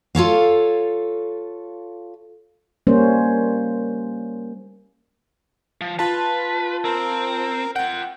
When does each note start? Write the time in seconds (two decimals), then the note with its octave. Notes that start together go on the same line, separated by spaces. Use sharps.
0.15 F4 A4 C#5 F5
2.87 G3 A#3 C#4 C5
5.81 F3
5.99 F4 B4 A5
6.84 C4 A#4
7.76 F4 F#5 G5